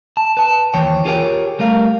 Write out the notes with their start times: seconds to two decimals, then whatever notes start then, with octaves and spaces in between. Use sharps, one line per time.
0.17 A5
0.37 B4 A5
0.74 D#2 E3 C5 C#5 G5
1.05 F4 G4 G#4 A#4 C#5 G5
1.59 G3 A3 A#4 F5